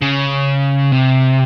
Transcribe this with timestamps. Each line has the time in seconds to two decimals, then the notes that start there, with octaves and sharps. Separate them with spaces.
0.02 C#3
0.92 C3